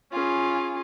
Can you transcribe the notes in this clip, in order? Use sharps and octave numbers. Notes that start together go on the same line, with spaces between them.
C#4 F4 G#4